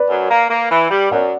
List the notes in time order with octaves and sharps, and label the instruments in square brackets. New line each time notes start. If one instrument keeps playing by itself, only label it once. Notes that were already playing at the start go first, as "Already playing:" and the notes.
Already playing: [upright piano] B4 D5
[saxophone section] F#2
A#3
A#3
E3
G3
[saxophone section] F#2 [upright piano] D5 F#5